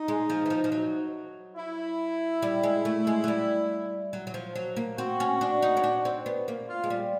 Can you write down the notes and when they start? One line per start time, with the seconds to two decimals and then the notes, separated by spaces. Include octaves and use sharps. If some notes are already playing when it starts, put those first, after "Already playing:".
Already playing: D#4
0.08 G#3
0.30 F3
0.46 E3
0.50 F3
0.64 F3
0.72 F#3
1.57 E4
2.42 G3
2.63 G#3
2.85 A3
3.07 G#3
3.24 F#3
3.28 G3
4.13 F#3
4.27 F#3
4.34 F3
4.55 F#3
4.77 A#3
4.98 C4 F#4
5.20 C#4
5.41 D4
5.62 D#4
5.77 C#4
5.84 D4
6.05 C4
6.26 B3
6.48 A#3
6.69 F4
6.84 G#3
6.90 G3